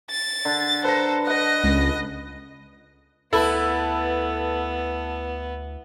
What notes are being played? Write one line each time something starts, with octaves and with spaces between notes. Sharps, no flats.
A6
D3
A4 B4 C5 A#5
B4 D#5 F#5 A#6
C#2
D2 B3 E4 A4 B4